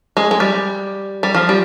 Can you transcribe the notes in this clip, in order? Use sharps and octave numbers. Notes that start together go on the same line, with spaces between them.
G#3
G#3
G3
G3
F3
G3